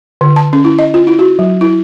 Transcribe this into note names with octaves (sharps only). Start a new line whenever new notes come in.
D3
A5
C#4
E4
D#5
F4
E4
F#4
F#3
E4